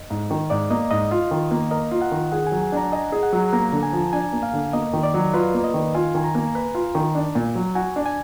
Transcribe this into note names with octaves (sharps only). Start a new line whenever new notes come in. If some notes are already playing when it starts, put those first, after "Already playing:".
Already playing: D#5
G#2
D#3
G#2 D5
A#3 D#5
G#2 D#5
F4
D#3
A#3
A#4 D#5
F4
F#5
D#3
G#4 F#5
G#5
F#3
G#5
D4 A#5
D#5 G#5
G#4
F#5
F#3
A#3 A#5
D3
G#5
F3
D4 G#5
A#3
F5
D3
A#3 D#5
D#3
D5
F#3
F4 B4
A#3
D#5
D#3
F4 G#5
D#3 G#5
A#5
A#3
B4
F4
D#3
D4
A#2
F#3
F#4 G#5
D4
G#5